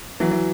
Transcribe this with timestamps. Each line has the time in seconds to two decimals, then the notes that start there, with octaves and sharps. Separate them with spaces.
0.20 E3 F#3
0.31 E3